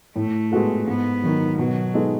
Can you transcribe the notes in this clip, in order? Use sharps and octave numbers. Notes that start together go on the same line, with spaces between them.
A2 A3
G#3 B3 F#4 A4
G#2 B3
D#3 F#3
B2 F#3
G#3 B3 D#4 A4